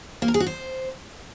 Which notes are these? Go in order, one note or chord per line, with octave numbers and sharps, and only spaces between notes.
A#3
A#4
G#4
F#4
C5